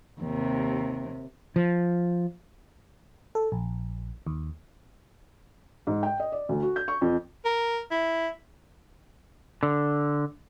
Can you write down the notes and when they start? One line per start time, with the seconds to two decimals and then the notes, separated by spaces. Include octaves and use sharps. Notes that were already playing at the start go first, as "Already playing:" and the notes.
0.21 D#2 C3
1.56 F3
3.35 A4
3.52 A#1
4.27 D#2
5.87 G#2
6.03 G5
6.20 D#5
6.32 D5
6.49 D2
6.63 F#4
6.76 G6
6.88 C#6
7.01 F2
7.45 A#4
7.91 E4
9.63 D3